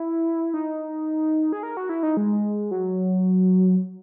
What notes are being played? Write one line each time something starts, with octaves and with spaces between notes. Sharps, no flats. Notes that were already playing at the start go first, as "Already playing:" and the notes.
Already playing: E4
D#4
G#4
A#4
F#4
E4
D#4
G#3
F#3